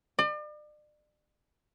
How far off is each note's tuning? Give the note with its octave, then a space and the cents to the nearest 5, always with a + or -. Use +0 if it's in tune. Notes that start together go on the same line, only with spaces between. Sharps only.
D5 +40